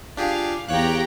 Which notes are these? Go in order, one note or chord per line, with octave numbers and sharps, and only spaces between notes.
D4 F4 G4 G#4 F5
E2 G4 C#5 F5 G5 A#5 F#6